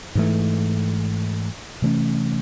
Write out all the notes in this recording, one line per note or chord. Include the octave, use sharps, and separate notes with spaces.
G#2 E3 A3
C3 E3 A3 C#4